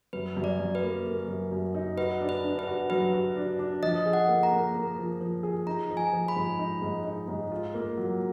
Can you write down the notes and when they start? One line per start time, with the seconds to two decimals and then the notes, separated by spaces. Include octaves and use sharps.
0.13 F#2 B4
0.37 F#2
0.44 D5
0.59 F#2
0.75 B4
0.82 A#3
1.06 A#3
1.28 F#2
1.52 F#2
1.74 D#4
1.98 F#4 B4
2.21 D4
2.29 B4
2.44 D4
2.59 B4
2.67 F#4
2.90 F#3 B4
3.13 F#4
3.36 D4
3.59 D4
3.82 F3 D#5
4.06 G#4
4.13 F#5
4.28 A#3
4.43 A#5
4.51 A#3
4.75 A#3
4.98 F3
5.20 F3
5.43 G#4
5.67 D#4 A#5
5.90 F3
5.97 G#5
6.13 F3
6.28 B5
6.36 G#2
6.59 D#4
6.82 G#2
7.05 D#4
7.28 G#2
7.52 F4
7.74 A#3
7.98 F#3